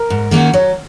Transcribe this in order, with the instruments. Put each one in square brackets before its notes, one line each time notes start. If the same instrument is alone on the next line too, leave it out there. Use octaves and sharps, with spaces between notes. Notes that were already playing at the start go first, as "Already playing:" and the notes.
Already playing: [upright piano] A#4
[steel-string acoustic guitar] G#2
D#3 A#3 C#4 F#4
[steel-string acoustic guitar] F#3 [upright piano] C#5